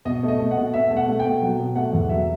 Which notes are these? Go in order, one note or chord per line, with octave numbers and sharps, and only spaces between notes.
B2 D#5
A3 D#5
A3
F#5
B2
B2 E5
A3
F#5
A3
G5
B2
F#3 F#5
B2
A3 F#5
E2
F#3 E5